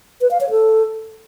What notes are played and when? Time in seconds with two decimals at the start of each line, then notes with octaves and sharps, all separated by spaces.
0.21 B4
0.31 F5
0.41 C#5
0.50 A4